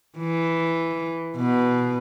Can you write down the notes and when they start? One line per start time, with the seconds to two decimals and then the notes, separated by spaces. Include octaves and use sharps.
0.18 E3
1.37 B2